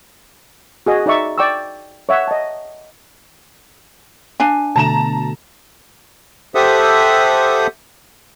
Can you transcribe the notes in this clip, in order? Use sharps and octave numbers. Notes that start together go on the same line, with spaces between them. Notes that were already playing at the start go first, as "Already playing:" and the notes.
F#4 G#4 D#5
D#4 D5 E5 C#6
D5 G5 C#6 D6 E6
C#5 E5 F#5
D#5 A5
D4 F5 G#5
B2 D3 A3 A5 A#5 E7
G4 A4 C5 E5 F#5 D#6